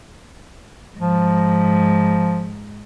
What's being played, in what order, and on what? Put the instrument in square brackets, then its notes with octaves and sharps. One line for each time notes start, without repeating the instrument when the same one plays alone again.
[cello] G#2 [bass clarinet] F3